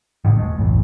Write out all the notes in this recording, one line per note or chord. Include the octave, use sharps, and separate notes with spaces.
A1 A2 D3 D#3
E1 G#3 A3
F#1 B1 E2 A2